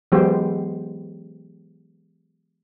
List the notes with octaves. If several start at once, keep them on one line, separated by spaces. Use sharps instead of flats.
E3 F#3 G#3 B3 G4 C5